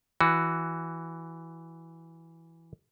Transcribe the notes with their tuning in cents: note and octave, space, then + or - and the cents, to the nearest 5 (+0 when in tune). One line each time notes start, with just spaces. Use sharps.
E3 +0 F#4 +0